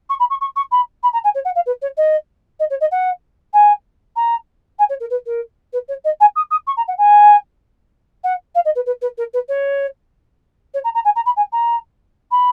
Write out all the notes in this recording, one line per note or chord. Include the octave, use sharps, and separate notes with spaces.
C#6
B5
C#6
C#6
C#6
B5
B5
A#5
G#5
C#5
F#5
F5
B4
C#5
D#5
D#5
C#5
D#5
F#5
G#5
A#5
G#5
C#5
A#4
B4
A#4
B4
C#5
D#5
G#5
D#6
D#6
C#6
A#5
F#5
G#5
F#5
F5
D#5
B4
B4
B4
A#4
B4
C#5
C#5
A#5
A#5
G#5
A#5
B5
G#5
A#5
B5